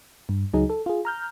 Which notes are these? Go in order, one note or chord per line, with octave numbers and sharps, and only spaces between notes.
G2
C#2 F#3 D#4 G#4
A4
F4 G#4
A#5 F6 G6